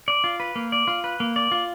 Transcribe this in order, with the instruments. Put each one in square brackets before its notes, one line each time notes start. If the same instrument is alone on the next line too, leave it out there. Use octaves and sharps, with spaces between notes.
[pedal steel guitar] D5
F4
B4
A#3
D5
F4
B4
A#3
D5
F4